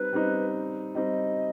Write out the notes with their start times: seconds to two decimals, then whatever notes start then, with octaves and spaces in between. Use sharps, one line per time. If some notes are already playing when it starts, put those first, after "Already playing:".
Already playing: G3 C4 D#4 B4
0.13 G3 C4 D#4
0.94 G3 C4 D#4 D#5